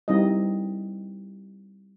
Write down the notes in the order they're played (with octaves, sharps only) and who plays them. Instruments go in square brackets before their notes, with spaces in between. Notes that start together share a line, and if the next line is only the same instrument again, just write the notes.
[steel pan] G3 C4 D#4 E4 D#5